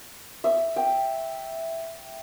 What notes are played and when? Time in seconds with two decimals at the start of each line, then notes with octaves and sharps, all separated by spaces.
0.44 E5
0.76 G5